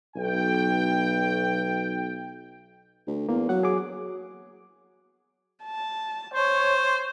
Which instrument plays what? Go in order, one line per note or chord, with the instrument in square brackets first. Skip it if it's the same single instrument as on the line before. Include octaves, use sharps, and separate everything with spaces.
[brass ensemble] B1 G5
[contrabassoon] D2
[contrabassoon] E2 [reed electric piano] A#3
[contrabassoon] F#3 [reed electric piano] F#5
[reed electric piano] G#4 D6
[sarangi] A5
[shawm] C5 [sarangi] C#5